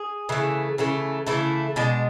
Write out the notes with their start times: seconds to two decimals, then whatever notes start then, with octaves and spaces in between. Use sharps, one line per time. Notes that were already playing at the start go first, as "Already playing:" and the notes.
Already playing: G#4
0.29 C#3 E3 A3
0.78 C#3 E3 A3
1.27 C#3 E3 A3 E4
1.76 B2 G#3 D4